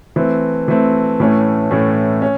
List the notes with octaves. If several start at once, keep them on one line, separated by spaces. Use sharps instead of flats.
E3 A3 C4
E3 A3 C4
A2 E3 A3 C#4
A2 E3 A3 C#4
C#4